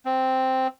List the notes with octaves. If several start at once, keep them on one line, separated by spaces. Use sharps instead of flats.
C4